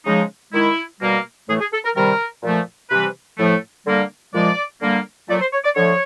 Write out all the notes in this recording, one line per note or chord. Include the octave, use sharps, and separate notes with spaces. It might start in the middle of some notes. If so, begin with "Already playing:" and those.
C#3 F3 G#3 D#4
D#3 G#3 E4
B2 G3 A#3
A2 E3 A3 G#4
G#4
A4
A#4
C3 D#3 G3 A#4
A#2 F3 A3
C3 E3 G3 B4
A2 F3 A3
D3 G3 A#3
A#2 F3 G#3 D5
D3 G3 A#3
A#2 F#3 A3 D5
C5
C#5
D5
D3 F3 A3 C#5